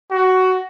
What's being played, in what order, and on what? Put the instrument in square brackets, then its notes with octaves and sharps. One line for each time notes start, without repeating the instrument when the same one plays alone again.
[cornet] F#4